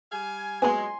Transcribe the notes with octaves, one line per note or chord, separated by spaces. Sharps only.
G3 F5 G#5
F#3 G#3 A#3 B3 B4 G#5 C6